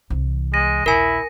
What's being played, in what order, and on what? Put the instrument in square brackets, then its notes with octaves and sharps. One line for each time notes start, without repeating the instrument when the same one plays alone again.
[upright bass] C2 E3
[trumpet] G#3 [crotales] A#6 D#7
[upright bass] A#1 D#2 [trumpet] E4 [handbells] A#4 G#5